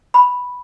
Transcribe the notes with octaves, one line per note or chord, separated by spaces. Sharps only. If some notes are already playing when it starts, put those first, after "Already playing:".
B5